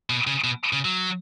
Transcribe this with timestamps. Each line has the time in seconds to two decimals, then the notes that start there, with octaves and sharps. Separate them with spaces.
0.10 B2
0.27 C#3
0.44 B2
0.73 C#3
0.85 F#3